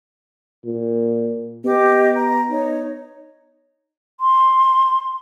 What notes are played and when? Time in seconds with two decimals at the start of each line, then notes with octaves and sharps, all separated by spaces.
0.65 A#2
1.65 B3 G4 D#5 D6
2.15 A#5
2.51 D#4 C#5
4.20 C6